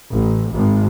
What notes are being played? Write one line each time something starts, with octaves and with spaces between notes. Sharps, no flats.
A1
G#1